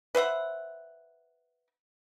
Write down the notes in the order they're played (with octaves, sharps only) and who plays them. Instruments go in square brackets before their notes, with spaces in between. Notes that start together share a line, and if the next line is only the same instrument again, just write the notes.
[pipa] B4 C5 E5 F#5